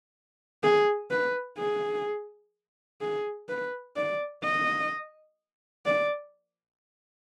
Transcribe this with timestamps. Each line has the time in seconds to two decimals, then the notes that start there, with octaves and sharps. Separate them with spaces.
0.63 G#4
1.11 B4
1.58 G#4
3.01 G#4
3.48 B4
3.96 D5
4.43 D#5
5.86 D5